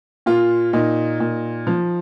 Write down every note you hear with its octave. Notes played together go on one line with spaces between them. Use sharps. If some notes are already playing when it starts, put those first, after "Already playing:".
A#2 F4
A#2 D#4
A#2
F3